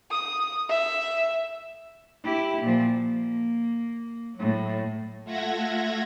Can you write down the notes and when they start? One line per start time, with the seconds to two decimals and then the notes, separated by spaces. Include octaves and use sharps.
0.11 D#6
0.69 E5
2.24 E4 G4
2.62 A#2 F3
2.94 A#3
4.36 A2 F#3
5.24 A3 F4 E5 F#5 G#6 A#6